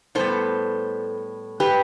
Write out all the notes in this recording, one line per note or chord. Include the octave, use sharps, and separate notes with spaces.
A2 G3 B3 A4 C5
G4 B4